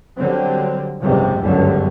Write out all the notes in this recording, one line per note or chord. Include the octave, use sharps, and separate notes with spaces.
D3 F#3 G3 C4
F#1 C#2 G#2 C3 G3
G1 C#2 F#2 D3 G3